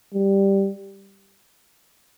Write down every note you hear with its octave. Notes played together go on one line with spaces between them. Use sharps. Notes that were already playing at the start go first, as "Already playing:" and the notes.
G3